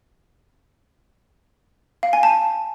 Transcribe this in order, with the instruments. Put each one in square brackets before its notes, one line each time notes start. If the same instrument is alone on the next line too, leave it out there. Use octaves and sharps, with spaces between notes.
[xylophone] F5
G#5
A5